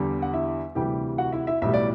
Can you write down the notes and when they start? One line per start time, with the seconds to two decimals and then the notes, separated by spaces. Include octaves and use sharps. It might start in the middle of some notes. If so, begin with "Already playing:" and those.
Already playing: E2 D3 G3
0.22 F#5
0.34 E4 E5
0.75 D2 C3 E3 G3 G4 G5
1.18 F#4 F#5
1.32 E4 E5
1.47 E4 E5
1.62 B1 A2 E3 G3 E5
1.74 D5